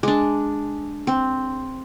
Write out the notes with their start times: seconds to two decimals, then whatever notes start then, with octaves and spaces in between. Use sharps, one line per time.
0.03 G#3 D4
1.07 C4